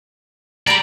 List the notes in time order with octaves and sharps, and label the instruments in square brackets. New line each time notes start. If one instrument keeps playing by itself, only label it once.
[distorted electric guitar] G3 D5 [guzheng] A#5 B5